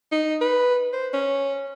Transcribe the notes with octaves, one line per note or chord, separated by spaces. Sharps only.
D#4
B4
C5
C#4